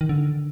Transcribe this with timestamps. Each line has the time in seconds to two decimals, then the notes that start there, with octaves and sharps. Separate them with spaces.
0.01 D#3
0.09 D3